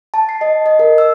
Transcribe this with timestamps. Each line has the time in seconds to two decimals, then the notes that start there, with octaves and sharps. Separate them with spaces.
0.14 A5
0.29 C7
0.41 D#5
0.66 D#5
0.79 A#4
0.98 E6